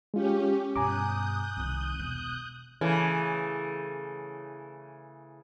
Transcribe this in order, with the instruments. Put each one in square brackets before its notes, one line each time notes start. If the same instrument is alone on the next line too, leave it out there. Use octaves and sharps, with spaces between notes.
[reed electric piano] G#3 F4 [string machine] C#4 G4
[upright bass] G2 B2 [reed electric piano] G#5 A#5 D6 [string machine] D#6 F#6 G6
[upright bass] C2 D#3
E1
[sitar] C#3 E3 A3